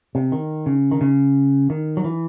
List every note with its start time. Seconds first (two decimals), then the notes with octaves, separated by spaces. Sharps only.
0.15 C3
0.32 D#3
0.66 C#3
0.91 D#3
1.01 C#3
1.70 D#3
1.97 F#3
2.04 E3